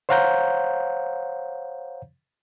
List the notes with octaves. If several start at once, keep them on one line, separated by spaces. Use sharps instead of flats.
C5 C#5 F5 F#5 A#5 G6